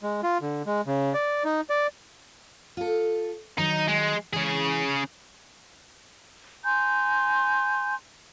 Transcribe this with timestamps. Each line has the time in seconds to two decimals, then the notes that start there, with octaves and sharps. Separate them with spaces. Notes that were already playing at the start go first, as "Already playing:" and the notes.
0.03 G#3
0.23 F4
0.42 D3
0.66 G#3
0.87 C#3
1.14 D5
1.44 D#4
1.70 D5
2.77 F4 A4
3.58 D#3 F#3 D#4
3.87 G#3
4.33 C#3 E3 G#3 G#4
6.65 G#5 A#5 C6 G6